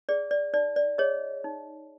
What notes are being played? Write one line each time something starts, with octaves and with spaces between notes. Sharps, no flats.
G#4 D5
D5
D#4 D5
D5
G#4 C#5 D#5
D#4